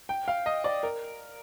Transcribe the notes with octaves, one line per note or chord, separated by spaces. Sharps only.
G5
F5
D#5
D5
A#4